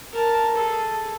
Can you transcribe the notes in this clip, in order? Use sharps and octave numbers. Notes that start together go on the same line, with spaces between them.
A#4 A5
G#4 A4